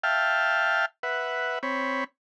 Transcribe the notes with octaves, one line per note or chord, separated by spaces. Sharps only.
E5 F5 G5 A5 F6
B4 E5 F#5
C4 C#5 B5